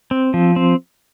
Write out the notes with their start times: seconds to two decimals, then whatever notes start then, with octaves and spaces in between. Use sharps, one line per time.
0.11 C4
0.34 F3
0.56 C4